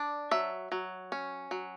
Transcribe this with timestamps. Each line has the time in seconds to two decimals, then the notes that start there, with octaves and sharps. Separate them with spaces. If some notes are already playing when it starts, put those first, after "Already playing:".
Already playing: D4
0.31 F#3 E5
0.72 F#3
1.12 C#4
1.51 F#3